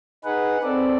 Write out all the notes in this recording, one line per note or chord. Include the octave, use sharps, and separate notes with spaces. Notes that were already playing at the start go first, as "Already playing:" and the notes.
D#4 G#4 B4 F#5
C4 A4 D5